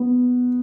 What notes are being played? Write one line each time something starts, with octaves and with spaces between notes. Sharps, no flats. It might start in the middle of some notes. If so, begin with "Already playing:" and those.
Already playing: B3